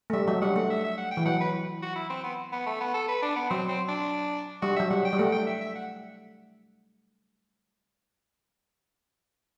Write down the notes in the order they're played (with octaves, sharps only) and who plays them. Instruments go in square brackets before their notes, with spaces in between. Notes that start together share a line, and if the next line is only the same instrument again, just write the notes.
[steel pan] A3
[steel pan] G3 [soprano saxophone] E5
[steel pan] F#3 [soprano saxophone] E5
[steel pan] G3 [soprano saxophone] F#5
[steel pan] A3 [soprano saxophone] F#5
[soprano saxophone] E5
E5
F#5
G5
[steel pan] E3
[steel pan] F#3 [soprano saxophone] F#5
[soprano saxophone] B4
F#4
E4
C4
B3
B3
A3
B3
A4
B4
D4
B3
[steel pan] F#3 [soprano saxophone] C4
[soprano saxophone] C4
D4
[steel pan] G3 [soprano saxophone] F#4
[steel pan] F#3 [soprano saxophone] E5
[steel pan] G3 [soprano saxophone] F#5
[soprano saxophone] G5
[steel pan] G3
[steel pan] A3 [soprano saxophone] F#5
[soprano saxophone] G5
E5
E5
F#5